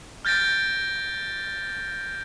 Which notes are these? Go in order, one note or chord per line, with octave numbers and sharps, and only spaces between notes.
F6 G6 A6 A#6 D7